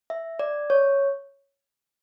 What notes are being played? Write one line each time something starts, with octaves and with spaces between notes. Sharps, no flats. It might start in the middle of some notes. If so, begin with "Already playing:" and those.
E5
D5
C#5